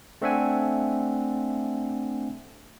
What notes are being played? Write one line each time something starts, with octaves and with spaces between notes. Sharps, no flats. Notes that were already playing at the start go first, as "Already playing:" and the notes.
A3 C4 D4 E5 F#5 G#5